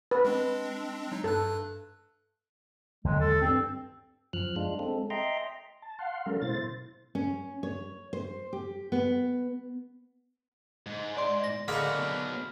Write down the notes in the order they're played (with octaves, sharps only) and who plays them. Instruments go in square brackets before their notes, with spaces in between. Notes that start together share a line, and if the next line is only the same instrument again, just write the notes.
[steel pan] B4
[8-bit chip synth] G#3 C4 D4
F#3 D#4
[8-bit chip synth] G2 F#6 [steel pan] A4
[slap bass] D#2 D3 F#3 [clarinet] G#3
[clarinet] A4
[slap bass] G2 [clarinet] C4
[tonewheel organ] F#2 F3 F6 F#6
G#3 D4 F4
G#3 C4 A4
D#5 E5 G5 A#5 C6
A5
F5 F#5 C6
F#3 G#3 C#4 A4 A#4 F5
B2 E4 C5 A6
[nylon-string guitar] C#4
C#5
C5
G4
B3
[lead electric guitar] G#2
[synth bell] D5 C6
[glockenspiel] A#6
[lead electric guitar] A2 F#4 [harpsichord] D3 G#3 A#3 [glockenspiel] B5 F6 [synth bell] B6
[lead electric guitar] B2 F#3